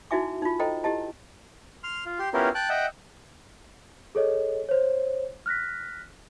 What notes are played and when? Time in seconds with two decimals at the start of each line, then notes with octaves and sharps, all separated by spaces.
0.11 D#4 E4 F#4 E5 G#5 D6
0.42 D#4 F4
0.59 A4 C5 D#5 G5 A#5
0.84 E4 G4 D#5 A5
1.84 C6 F6
2.06 F4
2.19 G4 C6
2.34 B3 C#4 E4 F4 G4 A#4
2.55 G5 A5 F#6
2.69 D#5 E5 F#5 G5
4.15 G#4 A4 C#5 D#5
4.69 C5 C#5
5.46 F6 F#6 A#6 B6